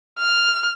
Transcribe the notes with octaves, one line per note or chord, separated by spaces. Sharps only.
F6